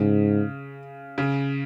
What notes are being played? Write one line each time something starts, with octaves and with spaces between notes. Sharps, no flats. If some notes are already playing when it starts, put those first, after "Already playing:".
Already playing: G#2 C#3
C#3